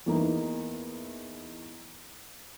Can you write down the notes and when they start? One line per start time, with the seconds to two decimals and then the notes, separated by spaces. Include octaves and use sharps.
0.06 E2 A#3 D#4 E4